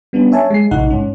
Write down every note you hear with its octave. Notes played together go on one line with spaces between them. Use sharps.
G3 B3 C#4 D4
C#5 E5 G#5 A5
G#3 C7
A#1 A2 C3 D#4 F#5
G#2 C#4